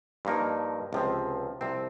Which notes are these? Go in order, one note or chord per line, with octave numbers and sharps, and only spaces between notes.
G2 F3 A#3 D#4 A#4
C#2 C3 F3 C4
C2 C3 F3 C4